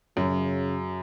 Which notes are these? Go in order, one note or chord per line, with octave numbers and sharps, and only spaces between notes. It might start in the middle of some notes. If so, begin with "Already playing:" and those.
F#2 C#3